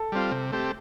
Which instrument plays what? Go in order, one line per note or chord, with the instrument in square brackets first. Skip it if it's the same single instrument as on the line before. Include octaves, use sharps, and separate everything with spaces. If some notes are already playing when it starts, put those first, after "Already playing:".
Already playing: [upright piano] A4
[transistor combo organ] G3 C4 F4
C3
A3 C4 G4